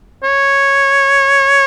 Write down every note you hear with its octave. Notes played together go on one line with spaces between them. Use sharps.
C#5